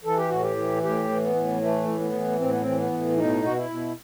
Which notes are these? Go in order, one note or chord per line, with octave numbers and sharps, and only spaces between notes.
E3 A4
G4
A2 F#4
G4
E3
A2 G4
E3
B3
A2
E3 A3
A2
B3
E3
A2 C4
B3
E3 C4
B3
A2
B2 D#4
B2 F#4
E4
B2